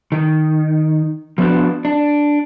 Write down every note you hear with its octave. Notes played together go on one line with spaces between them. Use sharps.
D#3
F3 B3 D4 F#4
D4